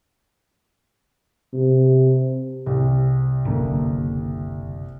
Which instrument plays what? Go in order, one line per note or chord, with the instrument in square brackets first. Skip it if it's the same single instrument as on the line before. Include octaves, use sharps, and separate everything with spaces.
[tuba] C3
[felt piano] C2
[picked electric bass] F#1 D3 A#3